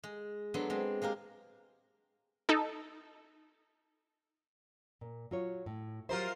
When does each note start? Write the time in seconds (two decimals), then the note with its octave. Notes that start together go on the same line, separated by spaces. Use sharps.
0.03 G#3
0.54 F#3 B3 D4 A4 C6
0.70 G#3 C4
1.02 G#3 A#3 G4 A#4
2.49 D#4 A4
5.01 A#2
5.31 F#3 F4 C#5
5.66 A2
6.09 F#3 F4 G4 A#4 C5 E5